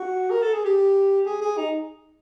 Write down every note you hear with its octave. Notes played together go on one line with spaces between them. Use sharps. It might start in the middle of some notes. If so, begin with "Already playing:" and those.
Already playing: F#4
A#4
A4
G#4
G4
G#4
G#4
D#4